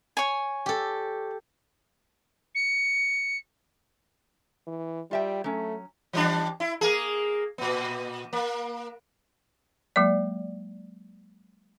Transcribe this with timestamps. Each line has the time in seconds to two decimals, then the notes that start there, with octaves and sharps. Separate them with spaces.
0.17 C#5 G#5
0.66 G4 A4
2.55 C#7
4.67 E3
5.11 G3 F4 E5 G5
5.44 F#3 A3 C#4
6.13 E3 G3 D4
6.60 E4
6.81 A#3 G#4
7.58 A#2 B3
8.33 A#3
9.96 F#3 G#3 A#3 D5